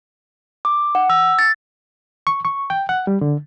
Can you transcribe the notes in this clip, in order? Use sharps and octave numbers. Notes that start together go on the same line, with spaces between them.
D6
F#5
E6
A6
C#6
C#6
G5
F#5
G3
D3